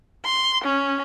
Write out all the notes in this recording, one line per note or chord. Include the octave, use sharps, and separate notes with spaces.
C6
C#4